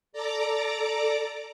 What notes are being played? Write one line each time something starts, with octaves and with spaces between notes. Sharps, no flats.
A4 D5 A#5 D6